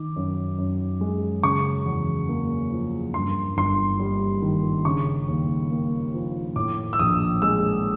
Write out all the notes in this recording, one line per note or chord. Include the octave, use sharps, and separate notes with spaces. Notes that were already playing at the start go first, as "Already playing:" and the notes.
Already playing: D#3 D6
F#2
F#2
G#3
C#3 C#6
E2
A#3
F3
G2 C6
G1 C6
G3
D#3
C#3 C#6
D#2
A#3
F3
A2 D6
E6
A#1 D#6
G#3 E6